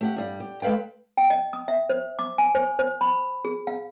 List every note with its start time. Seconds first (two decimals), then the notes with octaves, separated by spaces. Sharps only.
0.01 A3 G4 F#5
0.16 G2 G3
0.40 G4
0.62 G#3 A4 B4 F5 G5
1.17 G5
1.30 D#5
1.53 D#6
1.68 E5
1.89 C5
2.19 D6
2.38 G#5
2.55 C5
2.79 C5
3.01 B5
3.45 G#4
3.67 F5